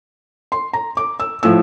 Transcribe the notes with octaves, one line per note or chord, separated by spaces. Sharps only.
C6
A#5
D6
E6
A2 F3 E6